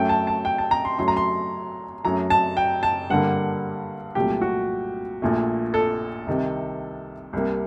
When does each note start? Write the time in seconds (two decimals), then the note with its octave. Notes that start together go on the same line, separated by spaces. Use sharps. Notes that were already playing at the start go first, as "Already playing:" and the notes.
Already playing: F#2 F#3 A3 G5
0.09 A5
0.27 A5
0.45 G5
0.58 A5
0.71 A#5
0.85 C6
0.98 F#2 F#3 A3 C6
1.08 A#5
1.17 C6
2.05 F#2 F#3 A3 A#5
2.30 A5
2.57 G5
2.83 A5
3.10 G2 D3 G3 A#3 F#5
4.15 C2 A#2 F#3 A3 G4
4.42 F#4
5.22 A#1 A#2 A3
5.74 A4
6.27 C2 C3 D#3
7.33 C2 C3 G3 A#3